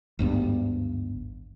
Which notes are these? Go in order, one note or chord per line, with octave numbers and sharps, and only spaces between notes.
G#1 D2 G2 B3